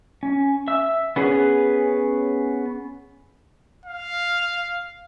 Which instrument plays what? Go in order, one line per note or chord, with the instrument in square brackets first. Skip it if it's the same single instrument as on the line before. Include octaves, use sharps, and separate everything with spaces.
[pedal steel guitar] C#4
E5 E6
B3 C#4 G#4 B4 C#5
[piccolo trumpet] F5